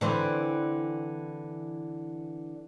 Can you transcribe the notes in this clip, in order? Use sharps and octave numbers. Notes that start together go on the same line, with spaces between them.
D3 E3 C4